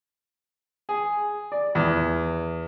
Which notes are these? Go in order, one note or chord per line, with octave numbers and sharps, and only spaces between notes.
G#4
D5
E2